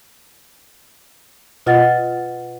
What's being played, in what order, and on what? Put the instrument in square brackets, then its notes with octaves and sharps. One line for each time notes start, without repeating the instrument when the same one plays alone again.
[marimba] B2 F4 D#5 F#5 A6